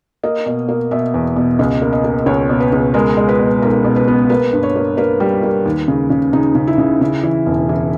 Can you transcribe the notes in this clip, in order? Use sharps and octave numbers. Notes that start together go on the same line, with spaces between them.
A#3 D#5
B2
A#3
B2 E5
E2
B2
C#2 D#5
A#3
D#5
A#3
C#2 C#5
B2
B4
C#2
G#3 A#4
G#3
B4
B2
B1 A#4
B2
B4
B3
A#3 B4
G2
C#5
A#3
A#3 B4
G3
A#3
D#2
C#3
C#3
C#3 D#4
C#3
E4
C#3
C#3
E3
E1
E3